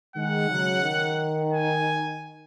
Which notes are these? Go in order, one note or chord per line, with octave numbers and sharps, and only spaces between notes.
D#3 G#3 F#5
C#3 F#3
D#3
G#5